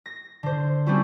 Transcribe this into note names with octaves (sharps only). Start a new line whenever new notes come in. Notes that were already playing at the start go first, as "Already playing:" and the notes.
A#6
D3 C5
G3 A3 C4 C#4 E4 F#4